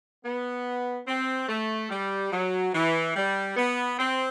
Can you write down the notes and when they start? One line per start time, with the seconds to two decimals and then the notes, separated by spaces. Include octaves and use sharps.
0.25 B3
1.08 C4
1.49 A3
1.90 G3
2.32 F#3
2.73 E3
3.16 G3
3.57 B3
3.99 C4